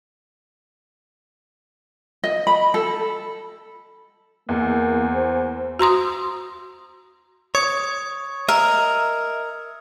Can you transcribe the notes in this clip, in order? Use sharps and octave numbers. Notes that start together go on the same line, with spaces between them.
D#5
B5
A4
E2 A#3
C5
F#4 A#5 C6 D#6
C#5 D#6 G#6 C#7
A#4 D#5 E5